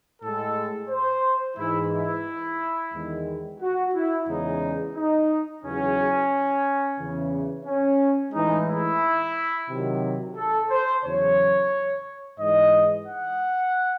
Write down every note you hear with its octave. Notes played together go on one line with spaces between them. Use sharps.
A2 G#3 A4
C5
G#2 E3 G#3 E4
E4
E2 D#3 G#3
F#4
E4
E2 C#3 G#3 D#4
D#4
E2 C#3 F#3 C#4
E2 C#3 E3
C#4
A2 E3 G#3 D#4
E4
C3 D#3 F#3
A4
C5
E2 C#3 F#3 C#5
G#2 E3 G#3 D#5
F#5